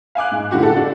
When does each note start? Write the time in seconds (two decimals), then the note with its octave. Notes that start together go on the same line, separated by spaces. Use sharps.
0.15 F5 G#5 D6 F#6
0.31 G#2
0.51 A2 D3 E3 F#4 G4
0.63 A4 F#5
0.76 D4 F#4